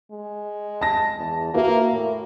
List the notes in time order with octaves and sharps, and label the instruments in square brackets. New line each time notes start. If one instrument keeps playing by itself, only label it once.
[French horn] G#3
[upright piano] A5 A#6
[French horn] E2
[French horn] A#3 [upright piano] F#4 A#4 E5
[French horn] A2